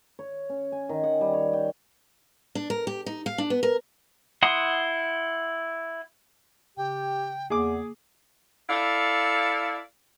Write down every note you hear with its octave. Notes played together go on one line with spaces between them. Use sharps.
C#5
C#4
G#5
D#3
F#5
G3
C#5
G5
D4
A#4
G4
D#4
F5
D4
B3
A#4
E4 F#5 C6 D#6
C#3 G4 G5
E2 A#3 G#4 D6
E4 A4 D5 F5